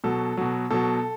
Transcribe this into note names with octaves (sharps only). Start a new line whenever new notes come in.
B2 F#3 A4
B2 F#3
B2 F#3 A4